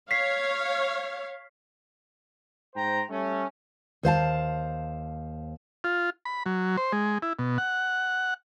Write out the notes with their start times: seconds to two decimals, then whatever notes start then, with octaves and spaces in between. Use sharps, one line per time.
0.11 C#5 F5 B6 C7
2.75 G#2 C5 G5 A#5
3.10 G3 A3 C#4
4.03 D#2 C5 F5 A5
5.84 F4
6.26 B5
6.46 F#3
6.77 C5
6.93 G#3
7.22 E4
7.39 B2
7.58 F#5